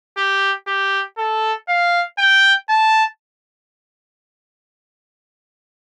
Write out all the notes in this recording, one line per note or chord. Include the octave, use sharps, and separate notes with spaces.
G4
G4
A4
F5
G5
A5